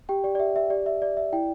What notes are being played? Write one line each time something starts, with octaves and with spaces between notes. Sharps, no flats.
G4 G5
G4 D5
D5
G4 E5
G4 E5
G4 D5
D5 E5
D5
D5 E5
E4 G5